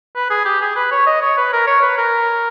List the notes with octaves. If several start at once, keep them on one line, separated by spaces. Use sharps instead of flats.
B4
G#4
G4
G#4
B4
C#5
D#5
C#5
B4
A#4
C#5
B4
A#4